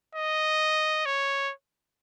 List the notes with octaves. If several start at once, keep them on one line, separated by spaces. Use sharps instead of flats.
D#5
C#5